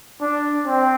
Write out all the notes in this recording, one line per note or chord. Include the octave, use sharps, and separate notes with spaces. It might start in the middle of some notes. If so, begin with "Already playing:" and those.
D4
C4